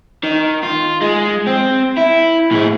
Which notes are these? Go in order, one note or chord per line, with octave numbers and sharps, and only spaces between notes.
D#3
F4
G#3
C4
E4
A2 G#4